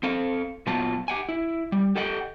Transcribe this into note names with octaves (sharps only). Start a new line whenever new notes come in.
C4 A4 F5
A#2 F#3 B3 F4 A5
G4 F#5 G#5
E4
G3
G4 A4 D#5 F#5 G5